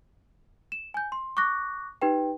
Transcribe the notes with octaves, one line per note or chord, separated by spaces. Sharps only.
E7
G#5 G6
C6
C#6 D6 F#6 A#6
D#4 G4 B4 G5